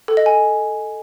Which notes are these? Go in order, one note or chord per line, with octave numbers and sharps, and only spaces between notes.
A4
D#5
G#5